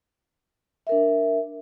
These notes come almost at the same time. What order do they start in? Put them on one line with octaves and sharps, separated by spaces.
E5 A#4 D4